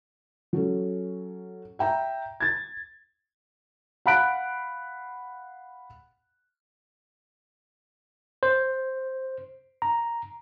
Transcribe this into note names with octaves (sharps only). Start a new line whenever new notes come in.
F#3 C#4 A4
E5 G5 A#5
G#6 A6
F5 F#5 B5 F#6 D7
C5
A#5